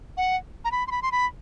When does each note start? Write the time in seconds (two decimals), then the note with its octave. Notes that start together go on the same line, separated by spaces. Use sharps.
0.17 F#5
0.65 A#5
0.72 B5
0.87 C6
0.91 B5
1.02 C6
1.12 B5